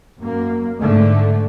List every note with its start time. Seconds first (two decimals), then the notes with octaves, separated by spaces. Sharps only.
0.20 F#2 A#3
0.79 G#2 D3 A3